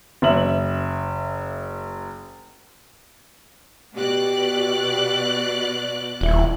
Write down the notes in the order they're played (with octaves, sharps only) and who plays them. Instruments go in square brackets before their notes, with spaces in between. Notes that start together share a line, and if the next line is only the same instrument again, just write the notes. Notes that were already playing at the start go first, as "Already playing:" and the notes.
[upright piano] F#1 E5 F#7
[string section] B2 D5 F#6 [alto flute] G4
[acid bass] D#1 [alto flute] E4